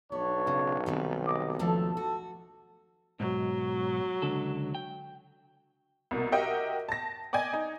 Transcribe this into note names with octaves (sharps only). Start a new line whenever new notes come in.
B1 B3 D4 C#5
C#3
C3 D#3 G3
D#5 D6
D#2 F3 A3 A4
F#4
B1 G#2 F#3
C#2 D3 A4
G5
C2 B2 A#3
F#4 G4 A#4 D#5 E5 G5
A5 A#6
D5 D#5 G5 G#5 G#6
D#4